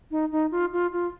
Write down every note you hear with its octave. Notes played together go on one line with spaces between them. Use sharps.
D#4
D#4
F4
F4
F4